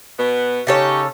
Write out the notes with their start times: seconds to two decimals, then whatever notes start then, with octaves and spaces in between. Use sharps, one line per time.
0.18 B2 B3
0.67 C#3 D#4 G4 A4 C#5